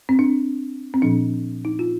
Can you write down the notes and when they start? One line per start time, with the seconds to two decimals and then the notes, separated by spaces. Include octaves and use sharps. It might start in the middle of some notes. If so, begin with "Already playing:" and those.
0.09 C4
0.19 D4
0.94 C4
1.02 A#2 F3 D4
1.65 D#4
1.79 F4